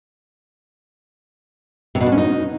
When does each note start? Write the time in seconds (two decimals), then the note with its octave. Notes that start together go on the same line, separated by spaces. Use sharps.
1.95 C3
2.01 B2
2.06 D4
2.12 C#4
2.18 D#4